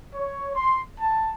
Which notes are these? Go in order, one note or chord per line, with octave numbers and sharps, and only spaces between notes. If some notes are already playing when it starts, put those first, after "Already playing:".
C#5
C6
A5